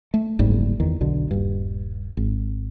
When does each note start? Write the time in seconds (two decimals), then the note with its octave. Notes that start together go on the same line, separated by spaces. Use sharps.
0.14 A3
0.39 F#1 C2 G#2 G3
0.80 E2 D#3
1.00 B1 B2 D3
1.31 D#1 G2
2.17 G#1